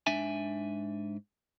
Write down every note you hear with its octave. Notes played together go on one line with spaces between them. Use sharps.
G#2 D4 E5 G#5